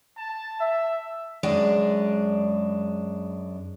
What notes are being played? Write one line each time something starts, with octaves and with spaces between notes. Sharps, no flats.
A5
E5
F#2 G#3 D4